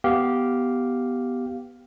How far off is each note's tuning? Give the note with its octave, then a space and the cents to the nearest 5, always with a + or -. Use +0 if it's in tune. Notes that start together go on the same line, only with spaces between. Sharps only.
B3 +0 G4 -10 F5 +0